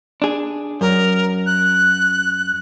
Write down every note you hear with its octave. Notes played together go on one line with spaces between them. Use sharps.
D4 G#4
F#2 A#4
F#6